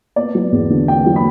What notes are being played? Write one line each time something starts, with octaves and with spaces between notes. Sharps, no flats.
B3 D5
F#3
E2
D3
B3 G5
F#3
B5